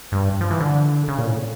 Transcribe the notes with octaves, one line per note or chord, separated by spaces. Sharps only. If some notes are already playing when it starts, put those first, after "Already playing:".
G2
F3
E3
D3
C#3
A#2
A2